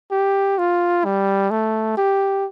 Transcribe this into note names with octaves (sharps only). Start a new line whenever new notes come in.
G4
F4
G3
A3
G4